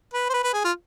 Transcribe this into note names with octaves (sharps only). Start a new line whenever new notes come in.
B4
C5
B4
B4
G#4
F4